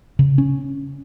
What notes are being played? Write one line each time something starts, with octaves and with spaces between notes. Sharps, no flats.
C#3
C#4